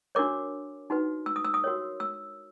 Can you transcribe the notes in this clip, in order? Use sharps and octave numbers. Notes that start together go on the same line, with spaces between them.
D4 F#4 A#4 C#5 D6
D#4 F#4 B4
E6
D#6
E6
D#6
F#4 A#4 C#5
E6